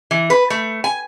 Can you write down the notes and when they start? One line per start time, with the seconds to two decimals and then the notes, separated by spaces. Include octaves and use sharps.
0.11 E3
0.30 B4
0.50 A3
0.84 G#5